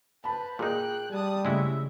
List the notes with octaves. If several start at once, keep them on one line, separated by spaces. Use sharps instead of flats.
B4 C5 A5 B5
A#2 D#4 G#4 G5 F#6
G3 A5 D#6
C#3 G#3 A3 E4 F#4 E5